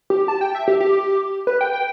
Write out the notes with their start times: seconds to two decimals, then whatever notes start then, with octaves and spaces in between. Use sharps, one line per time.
0.10 G4
0.28 A5
0.41 G5
0.55 E5
0.68 G4
0.80 G4
1.47 B4
1.61 G5
1.73 G5